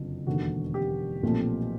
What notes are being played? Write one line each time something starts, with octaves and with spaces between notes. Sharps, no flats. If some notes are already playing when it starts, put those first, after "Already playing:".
Already playing: F#1 F2 D3 F#3
E1 D#2 D3 F#4
G4
B1 A#2 F3 A3 C4